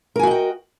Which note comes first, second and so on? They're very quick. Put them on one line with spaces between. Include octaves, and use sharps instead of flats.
A#4 G#5 F#4 D#5 G5